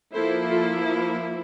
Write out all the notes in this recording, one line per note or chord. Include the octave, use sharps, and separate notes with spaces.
F3 A#3 E4 A4 C5
F4 A4